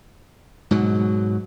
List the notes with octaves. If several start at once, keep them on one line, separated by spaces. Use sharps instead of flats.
G#2 B2 F#3